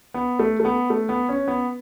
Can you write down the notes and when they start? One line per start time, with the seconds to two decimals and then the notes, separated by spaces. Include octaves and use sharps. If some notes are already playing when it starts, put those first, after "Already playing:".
0.14 B3
0.39 A3
0.60 A3
0.65 B3
0.90 A3
1.09 B3
1.29 C#4
1.48 B3